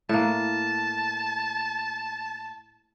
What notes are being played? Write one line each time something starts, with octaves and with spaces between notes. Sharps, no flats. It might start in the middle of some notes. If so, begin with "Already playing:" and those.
A2 A#3 A5